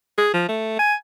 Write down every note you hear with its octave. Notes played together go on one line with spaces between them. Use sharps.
G#4
F3
A3
G#5